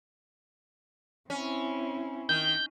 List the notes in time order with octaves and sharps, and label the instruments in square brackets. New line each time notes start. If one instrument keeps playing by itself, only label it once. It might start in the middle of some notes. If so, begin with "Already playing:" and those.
[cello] C4 E4 [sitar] C#4
[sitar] D#3 [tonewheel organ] G6